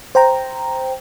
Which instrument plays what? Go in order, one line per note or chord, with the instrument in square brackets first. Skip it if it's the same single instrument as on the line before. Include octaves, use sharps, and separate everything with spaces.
[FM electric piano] C5 G5 A#5